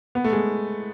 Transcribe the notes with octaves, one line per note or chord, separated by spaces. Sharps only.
B3
A3
G#3